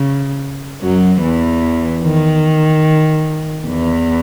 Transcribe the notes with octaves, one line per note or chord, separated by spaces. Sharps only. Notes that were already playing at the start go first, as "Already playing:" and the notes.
Already playing: C#3
F#2 F#3
E2 E3
D#3
E2 E3